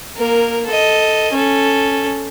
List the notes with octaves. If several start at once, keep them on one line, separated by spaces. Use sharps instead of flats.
A#3 A#4
A4 D#5
C#4 A4